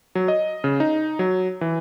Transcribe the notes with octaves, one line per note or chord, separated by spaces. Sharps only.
F#3
D#5
C#3
D#4
F#3
E3